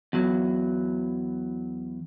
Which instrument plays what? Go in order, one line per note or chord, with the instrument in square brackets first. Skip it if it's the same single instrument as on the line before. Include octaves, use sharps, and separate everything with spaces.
[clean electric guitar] E2 F#3